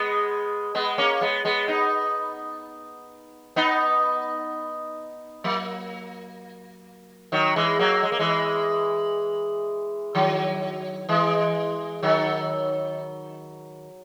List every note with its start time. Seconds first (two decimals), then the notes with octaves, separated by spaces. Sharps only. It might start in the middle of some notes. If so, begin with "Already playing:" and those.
Already playing: G#3 B3
0.75 G#3 B3
0.98 A#3 C#4
1.21 G#3 B3
1.45 G#3 B3
1.68 B3 D#4
3.56 B3 D#4
5.44 F#3 A#3
7.32 D#3 F#3
7.56 E3 G#3
7.79 F#3 A#3
8.03 G#3
8.12 A#3
8.19 E3 G#3
10.15 D#3 F#3
11.09 E3 G#3
12.03 D#3 F#3